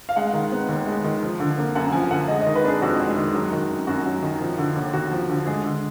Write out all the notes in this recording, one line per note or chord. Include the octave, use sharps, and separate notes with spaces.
F5
G#3 F#5
D#3
B3
D#2
G#3
D#3
F3
D3
A#3
F#2 F#5
F3 G#5
D3 F#5
G#3 D#5
D#5
D#3
B4
D4 G#4
F2 F#4
G#3
D#3
F#3
D#3
F#2
F#2 F#4
F#3
D#3
F3
D3
D#2
D#2 F#4
F3
D3
G#3 G#4
D3